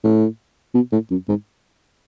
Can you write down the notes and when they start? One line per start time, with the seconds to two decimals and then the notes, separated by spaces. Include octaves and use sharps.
0.04 A2
0.74 B2
0.92 A2
1.11 F#2
1.29 G#2